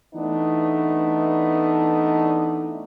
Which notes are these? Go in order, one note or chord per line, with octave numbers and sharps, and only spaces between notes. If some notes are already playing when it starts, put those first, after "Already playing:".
E3 A3 B3 D4 D#4